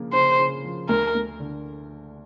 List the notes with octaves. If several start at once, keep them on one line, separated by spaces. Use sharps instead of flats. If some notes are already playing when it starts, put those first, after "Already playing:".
Already playing: C#3 F3 A#3
C#3 C5
C#3
F3
D2 A#4
D2
D3